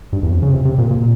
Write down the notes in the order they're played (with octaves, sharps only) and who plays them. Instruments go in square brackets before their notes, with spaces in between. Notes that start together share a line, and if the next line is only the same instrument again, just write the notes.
[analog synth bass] G2
E2
F2
C#3
C3
C3
A#2
A#2